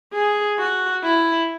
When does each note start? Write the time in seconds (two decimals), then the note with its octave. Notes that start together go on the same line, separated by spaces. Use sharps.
0.13 G#4
0.59 F#4
1.04 E4